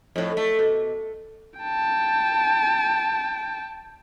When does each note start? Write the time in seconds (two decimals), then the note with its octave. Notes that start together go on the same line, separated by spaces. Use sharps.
0.16 F2 A2
0.37 A3
0.59 B2
1.60 G5 A5